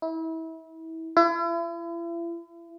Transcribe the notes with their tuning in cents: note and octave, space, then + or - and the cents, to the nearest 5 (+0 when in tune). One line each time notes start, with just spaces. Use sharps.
E4 -30
E4 +40